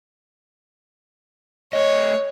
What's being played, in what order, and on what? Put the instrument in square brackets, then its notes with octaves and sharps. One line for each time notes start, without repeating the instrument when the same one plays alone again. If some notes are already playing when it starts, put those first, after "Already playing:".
[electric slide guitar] A3 D#5 [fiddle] C#5